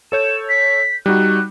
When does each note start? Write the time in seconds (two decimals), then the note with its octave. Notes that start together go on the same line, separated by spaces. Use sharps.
0.12 A4 C#5 G6 E7
0.49 B6
1.06 G3 D#4 F#4 F#6